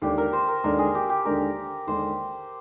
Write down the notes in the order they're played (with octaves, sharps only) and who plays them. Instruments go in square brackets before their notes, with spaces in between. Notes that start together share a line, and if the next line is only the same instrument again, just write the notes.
[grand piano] D#2 D3 G#3 D4 [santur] G4
[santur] A#4
C5
A#4
[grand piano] D#2 D3 G#3 D4 [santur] A#4
[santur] G#4
G4
G4
[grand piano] D#2 D3 G#3 D4 [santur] A#4
[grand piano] D#2 D3 G#3 D4 [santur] C5